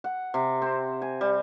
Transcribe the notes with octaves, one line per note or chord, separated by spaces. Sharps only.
F#5
C3
C4
G#5
G3